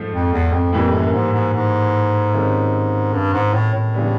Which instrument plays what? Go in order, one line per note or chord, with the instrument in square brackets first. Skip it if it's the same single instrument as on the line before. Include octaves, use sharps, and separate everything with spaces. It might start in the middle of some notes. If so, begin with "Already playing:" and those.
Already playing: [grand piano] G#2 F3 A3
[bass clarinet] F2
E2
F2
[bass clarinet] F2 [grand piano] A2 E3 G3 A#3
[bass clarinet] F#2
G#2
G#2
G#2
[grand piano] C3 D#3 G#3 C#4
[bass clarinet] G2
G#2
A2
A2
[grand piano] C#3 E3 G3 B3 D4